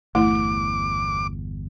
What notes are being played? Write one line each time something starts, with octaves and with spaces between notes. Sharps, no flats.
G1 E2 A3 E4 D6